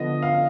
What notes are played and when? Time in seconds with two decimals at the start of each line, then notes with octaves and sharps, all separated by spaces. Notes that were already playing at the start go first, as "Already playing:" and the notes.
Already playing: D3 F3 B3 D#5
0.23 F5